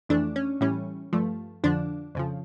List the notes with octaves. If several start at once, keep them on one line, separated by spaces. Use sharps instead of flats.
F2 E3 A3 D4
C#4
A2 E3 G3 C#4
G2 F3 A3
F2 D3 F3 D4
F2 C#3 F3